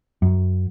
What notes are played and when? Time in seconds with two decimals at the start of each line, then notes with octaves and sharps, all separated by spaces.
0.22 F#2